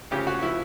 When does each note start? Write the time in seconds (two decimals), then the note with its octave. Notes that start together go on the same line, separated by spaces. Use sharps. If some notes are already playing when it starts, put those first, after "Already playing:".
0.11 D2 C#3 F3 G4
0.27 F#4
0.42 F3 E4